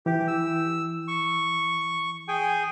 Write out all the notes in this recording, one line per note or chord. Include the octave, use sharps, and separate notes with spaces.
E3 G4
E6
C#6
G#4 G5 G#5